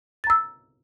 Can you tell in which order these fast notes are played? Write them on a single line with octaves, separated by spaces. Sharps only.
A6 A#5 E6